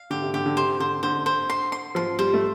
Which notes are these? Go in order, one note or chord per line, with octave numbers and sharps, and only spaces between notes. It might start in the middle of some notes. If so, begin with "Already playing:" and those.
Already playing: F5
D3 G4
C3
D3 G4
D3
C3 C5
D3 C5
D3 C5
C5
C6
C6
F3 C6
G3 C5
A3